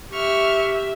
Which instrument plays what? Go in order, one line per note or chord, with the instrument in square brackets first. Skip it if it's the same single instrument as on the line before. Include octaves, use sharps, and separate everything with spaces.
[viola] G4 E5 [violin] C#6 F6